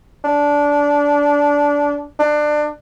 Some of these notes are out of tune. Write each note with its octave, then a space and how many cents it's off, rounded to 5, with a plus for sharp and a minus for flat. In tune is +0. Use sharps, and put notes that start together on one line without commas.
D4 -15
D4 +25